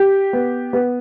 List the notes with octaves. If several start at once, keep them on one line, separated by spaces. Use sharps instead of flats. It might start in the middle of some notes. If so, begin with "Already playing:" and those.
Already playing: G4
B3
B3